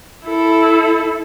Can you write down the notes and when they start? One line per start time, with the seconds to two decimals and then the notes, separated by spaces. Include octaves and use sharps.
0.25 E4 A4